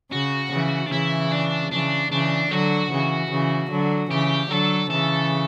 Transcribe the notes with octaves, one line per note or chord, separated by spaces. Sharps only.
C#3 F#4
C#3 E3
D4
C#3 E3 E4
D4
C#3 E3 D4
C#3 E3 D4
D3 F#3 F#4
C#3 E3
C#3 E3
D3 F#3
C#3 E3 G4
D3 F#3 A4
C#3 E3 A4